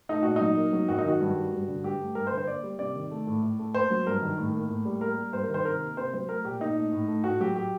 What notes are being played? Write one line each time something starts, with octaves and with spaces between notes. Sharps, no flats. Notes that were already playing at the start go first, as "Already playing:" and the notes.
A3 D#4
A#2 F#4
F#3 D#4
A#3
F#3
F#2 F#4
D#4
D#3 F#4
G2
G3
G2
D3
G2 G4
A3
G2 A#4
C5
D3
C5
A#3 D5
G3
C3 D5
D#3
A3
A2
A2
A3
A#3 C5
F#3
G2 A#4
D#3
A2
A#3
A2
G3
A#3 A#4
G3
G2 C5
A#4
D#3 C5
C3 A#4
A#3
C3 C5
F#3 C5
A3 A#4
A#2 G4
A#2 D#4
A3
A2
A3
A2 F#4
F#3 G4
G4